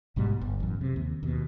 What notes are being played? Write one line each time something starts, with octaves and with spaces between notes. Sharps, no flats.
G#1 G#2 B2 G3
G1
A1 F#2
C3
D#2
D#2 B2